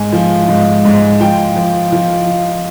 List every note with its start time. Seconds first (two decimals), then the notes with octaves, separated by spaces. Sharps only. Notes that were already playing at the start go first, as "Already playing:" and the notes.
Already playing: G#2 G#5
0.12 F3
0.48 G#2
0.85 G#2
1.20 F3 G5
1.56 F3
1.92 F3